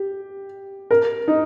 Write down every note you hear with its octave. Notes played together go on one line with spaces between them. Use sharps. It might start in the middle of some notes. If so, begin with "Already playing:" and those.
Already playing: G4
A#4
D#4